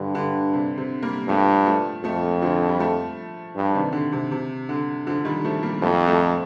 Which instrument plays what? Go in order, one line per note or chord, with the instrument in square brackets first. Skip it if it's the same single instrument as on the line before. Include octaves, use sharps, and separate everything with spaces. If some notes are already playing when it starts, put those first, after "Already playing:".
Already playing: [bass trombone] G2 [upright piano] D3
[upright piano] D3
C3
C3
G3 A#3
[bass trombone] G2 [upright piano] F3 A3
[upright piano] F3 A3
[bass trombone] F2 [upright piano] F3 A3
[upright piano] D3 F3
G3
F3 A3
[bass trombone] G2
[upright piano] C3 D#3
D3
C3
C3
D3
D3 F3
D#3 G3
F3 A3
G3 A#3
[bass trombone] F2 [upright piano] F3 A3
[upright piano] F3 A3